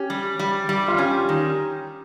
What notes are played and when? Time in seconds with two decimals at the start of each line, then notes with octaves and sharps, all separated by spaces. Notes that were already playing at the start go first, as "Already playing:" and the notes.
Already playing: C#4 G4
0.10 G3
0.39 G3
0.69 G3
0.88 F4
0.98 C#4 G4
1.29 D#3